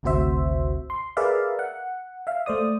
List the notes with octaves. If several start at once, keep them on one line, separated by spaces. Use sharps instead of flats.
G#1 D2 C3 F#4 C5 E5
C6
G#4 A#4 B4 D5 E5 F5
F#5
E5 F5
A3 C5 D5 D#6